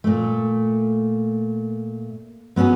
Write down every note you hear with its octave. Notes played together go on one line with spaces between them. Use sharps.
A#2 A3
F#3 B3 C#4 F#4 G#4